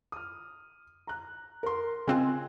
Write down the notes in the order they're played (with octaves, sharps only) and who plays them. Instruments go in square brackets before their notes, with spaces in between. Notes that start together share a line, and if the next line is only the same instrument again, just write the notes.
[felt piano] D#6 F6
A#5 F#6
A#4 C6
[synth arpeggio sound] C#3 C4 F4 [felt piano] D#5 G#5 F#6